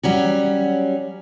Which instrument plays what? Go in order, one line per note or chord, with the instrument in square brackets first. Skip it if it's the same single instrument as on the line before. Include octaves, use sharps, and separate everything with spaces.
[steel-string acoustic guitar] F#3 G3 C#4 F#4